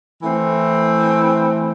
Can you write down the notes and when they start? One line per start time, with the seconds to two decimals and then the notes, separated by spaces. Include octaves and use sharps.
0.22 E3 A3 C4